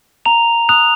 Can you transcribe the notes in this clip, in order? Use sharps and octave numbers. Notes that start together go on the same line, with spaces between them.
A#5 F7
D#6 F#6 F7